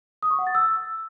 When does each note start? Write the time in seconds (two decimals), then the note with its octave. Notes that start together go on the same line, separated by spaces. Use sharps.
0.23 D#6
0.31 C#6
0.39 F#5
0.47 A6
0.55 E6